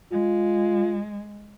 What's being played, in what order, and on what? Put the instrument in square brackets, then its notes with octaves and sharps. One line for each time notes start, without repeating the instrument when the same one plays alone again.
[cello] G#3 [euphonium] F4